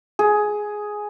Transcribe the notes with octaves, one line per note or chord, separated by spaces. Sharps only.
G#4